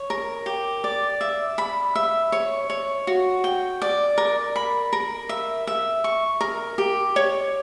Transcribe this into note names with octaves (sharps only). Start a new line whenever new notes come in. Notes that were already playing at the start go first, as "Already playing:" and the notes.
Already playing: C#5
A#4
G4
D5
E5
B5
E5
C#5
C#5
F#4
G5
D5
A#4
B5
A#4
E5
E5
C#6
A#4
G4
C#5